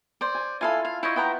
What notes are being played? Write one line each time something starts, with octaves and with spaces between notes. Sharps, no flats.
C5 D5
G#5
E4 F4 A4 F5 G#5
F5
E4 C5 C#5 D#5
B3 E4 G5 A#5